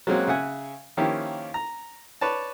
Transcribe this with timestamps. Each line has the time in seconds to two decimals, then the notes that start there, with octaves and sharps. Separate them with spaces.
0.07 F#3 G#3 A#3 C4 C#4 F#4
0.28 C#3 E5 F#5 G#5
0.97 D#3 F3 A#3 C#4 E4 G4
1.54 A#5
2.21 B4 C#5 D5 A5